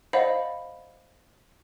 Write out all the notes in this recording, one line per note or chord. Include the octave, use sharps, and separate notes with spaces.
C5 D5 D#5 F5 F#5 B5